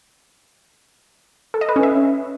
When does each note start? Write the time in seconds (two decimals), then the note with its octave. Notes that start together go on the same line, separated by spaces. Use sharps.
1.54 A4
1.61 D#5
1.69 B4
1.76 C#4
1.83 E5